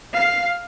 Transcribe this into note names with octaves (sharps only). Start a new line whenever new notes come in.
F5